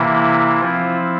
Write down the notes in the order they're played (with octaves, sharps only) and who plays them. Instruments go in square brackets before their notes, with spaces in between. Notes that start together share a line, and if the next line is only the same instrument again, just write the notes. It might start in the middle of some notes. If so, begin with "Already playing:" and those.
Already playing: [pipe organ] C3 E3 A#3 E4
F3 C4 E4 F4